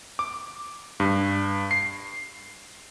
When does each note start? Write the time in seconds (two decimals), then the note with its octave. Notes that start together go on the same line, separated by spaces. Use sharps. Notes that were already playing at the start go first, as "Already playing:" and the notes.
0.19 D6
1.00 G2
1.71 C7